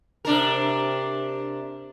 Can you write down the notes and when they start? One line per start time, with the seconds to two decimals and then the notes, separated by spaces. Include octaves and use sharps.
0.25 C3 D4 A#4